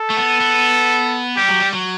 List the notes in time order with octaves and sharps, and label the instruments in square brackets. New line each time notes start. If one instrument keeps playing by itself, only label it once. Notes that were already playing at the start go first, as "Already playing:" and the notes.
Already playing: [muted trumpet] A4
[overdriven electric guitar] A3
B3
B3
[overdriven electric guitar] G3 [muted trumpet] G4
[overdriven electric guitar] F#3
G3
F#3